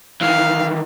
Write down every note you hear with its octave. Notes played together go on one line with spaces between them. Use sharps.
D#3 E3 F5